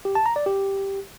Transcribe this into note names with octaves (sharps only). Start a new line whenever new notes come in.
G4
A5
A#5
D5
G4